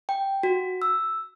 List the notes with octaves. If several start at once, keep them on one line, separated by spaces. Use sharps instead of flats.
G5
F#4
E6